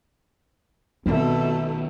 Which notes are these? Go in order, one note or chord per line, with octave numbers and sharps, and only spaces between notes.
B1 B2 D#3 A3 C4